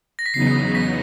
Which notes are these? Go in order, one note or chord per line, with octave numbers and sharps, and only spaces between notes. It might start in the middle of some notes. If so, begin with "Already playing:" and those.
A#6
B6
E2 C#3 F#3 B3 D#4 C7
B6